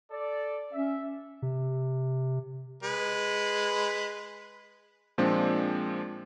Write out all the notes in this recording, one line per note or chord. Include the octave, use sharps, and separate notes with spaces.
A4 D5
C#4 E5
C3
G#3 B4
A#2 F3 G#3 C4 D4